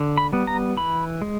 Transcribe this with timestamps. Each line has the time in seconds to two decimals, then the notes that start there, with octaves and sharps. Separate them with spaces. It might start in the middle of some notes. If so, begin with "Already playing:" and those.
Already playing: D3
0.17 B5
0.33 G3 B3
0.47 A#5
0.77 E3 B5
1.22 G#3